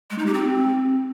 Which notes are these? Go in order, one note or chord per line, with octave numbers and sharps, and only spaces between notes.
G#3
D#4
G4
C4